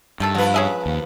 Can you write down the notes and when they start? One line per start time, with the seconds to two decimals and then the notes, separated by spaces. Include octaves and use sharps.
0.20 G2 D#3 A3 A4
0.35 F3 B4
0.54 C#4 G#4 E5
0.86 D#2